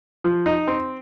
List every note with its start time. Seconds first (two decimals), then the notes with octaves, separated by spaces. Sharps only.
0.24 F3
0.46 D#4
0.67 C4